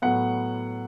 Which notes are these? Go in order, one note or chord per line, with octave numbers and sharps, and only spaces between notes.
A2 F#3 B3 F#5